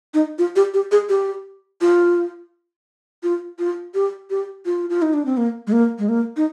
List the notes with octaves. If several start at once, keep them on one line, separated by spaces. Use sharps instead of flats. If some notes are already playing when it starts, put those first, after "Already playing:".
D#4
F4
G4
G4
G#4
G4
F4
F4
F4
G4
G4
F4
F4
D#4
D4
C4
A#3
G#3
A#3
G#3
A#3
D#4